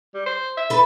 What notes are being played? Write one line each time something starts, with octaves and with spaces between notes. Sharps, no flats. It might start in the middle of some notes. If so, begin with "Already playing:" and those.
G3
C5
E5
A4 B4